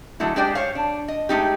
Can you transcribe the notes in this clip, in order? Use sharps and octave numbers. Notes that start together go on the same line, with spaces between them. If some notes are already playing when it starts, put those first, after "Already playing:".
D3 F#3 G#3 A3 E4
G#3 D4 G4 C5 D5 G5
C5 C#5 F5
D4
D#5
G#3 A3 D#4 G4